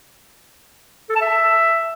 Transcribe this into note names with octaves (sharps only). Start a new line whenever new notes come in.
A4
A5
E5